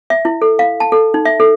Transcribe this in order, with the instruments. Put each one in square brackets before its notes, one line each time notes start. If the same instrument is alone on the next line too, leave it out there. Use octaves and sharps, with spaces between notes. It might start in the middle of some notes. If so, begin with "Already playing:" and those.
[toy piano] E5
E4
A4
F5
A5
A4
D#4
E5
A4